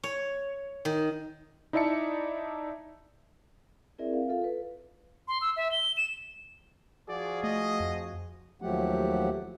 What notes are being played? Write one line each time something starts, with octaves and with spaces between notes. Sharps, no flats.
C#5
D#3
D#4 E4 D5 E5 A5 C#7
C4 E4 G#4 A#4 D5 E5
F5
F4 A4 F5
A4 B4
C6
E6
E5
G7
E7
F3 F#4 G#4 D5
A3 D#5
F2
D#2 F3 F#3 A3 G4 F#5